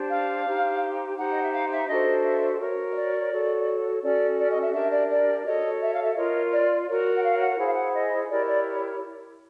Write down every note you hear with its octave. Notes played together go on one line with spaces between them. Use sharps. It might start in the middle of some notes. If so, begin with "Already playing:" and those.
Already playing: D4 G4 C5
F5
D#4 G4 C5
D#4 G4 C5 F#5
D#5
E5
F5
E5
D4 F#4 A4 C5 D#5
E5
F#4 A#4 C#5
D#5
D5
F#4 A4 C#5
C#4 F#4 A4 D5
D5
D#5
E5
D4 G4 A#4 E5
D5
D5
F#4 A4 C#5 D#5
E5
F5
E5
F4 A#4 C#5 D#5
D5
F#4 A#4 C#5
F#5
F5
F#5
E4 G#4 C5 F#5
F5
F#5
D#5
E4 G4 A#4 C#5 D5
D5